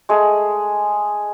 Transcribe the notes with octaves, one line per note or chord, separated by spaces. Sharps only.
G#3 A3 G#4